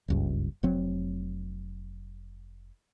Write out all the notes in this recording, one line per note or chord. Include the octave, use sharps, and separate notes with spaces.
F#1 C#2 G2
F1 F#3 C4